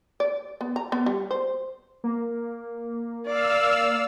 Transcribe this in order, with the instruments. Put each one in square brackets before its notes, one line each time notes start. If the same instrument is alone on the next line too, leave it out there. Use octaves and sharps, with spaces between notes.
[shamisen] D5
B3
A#5
B3
G3
C5
[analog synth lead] A#3
[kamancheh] D5 [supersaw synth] F5 E6